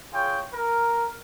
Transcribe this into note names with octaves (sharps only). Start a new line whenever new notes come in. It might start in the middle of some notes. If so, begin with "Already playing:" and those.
F4 G#4 C#5 G5
A#4